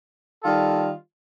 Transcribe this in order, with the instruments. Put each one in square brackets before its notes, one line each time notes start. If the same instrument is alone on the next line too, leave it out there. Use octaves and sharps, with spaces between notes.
[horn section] D#3 G3 F4 A4